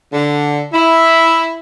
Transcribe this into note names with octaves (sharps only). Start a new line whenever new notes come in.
D3
E4